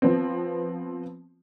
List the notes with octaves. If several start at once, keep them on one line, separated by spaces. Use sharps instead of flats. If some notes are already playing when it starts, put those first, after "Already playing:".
F3 B3 C4